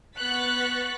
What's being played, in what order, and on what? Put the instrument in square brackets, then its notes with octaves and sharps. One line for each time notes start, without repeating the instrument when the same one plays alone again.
[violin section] B3 C#6 F#6 A6 B6